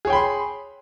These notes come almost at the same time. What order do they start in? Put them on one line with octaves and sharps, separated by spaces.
G#4 C#5 G5 B5 C6